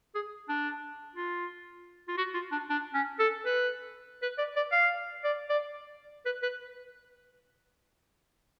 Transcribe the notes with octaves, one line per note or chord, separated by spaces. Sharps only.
G#4
D4
F4
F4
F#4
F4
D4
D4
C#4
A4
B4
B4
D5
D5
F5
D5
D5
B4
B4